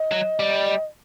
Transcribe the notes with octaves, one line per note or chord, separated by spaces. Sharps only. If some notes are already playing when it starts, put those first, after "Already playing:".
Already playing: D#5
F#3
G3